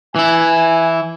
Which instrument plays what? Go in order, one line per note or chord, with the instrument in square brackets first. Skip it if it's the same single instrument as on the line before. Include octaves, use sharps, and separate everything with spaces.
[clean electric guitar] E3 E4 [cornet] G#5